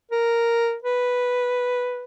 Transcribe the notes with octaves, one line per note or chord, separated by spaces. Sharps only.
A#4
B4